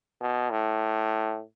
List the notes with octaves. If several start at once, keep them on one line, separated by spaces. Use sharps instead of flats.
B2
A2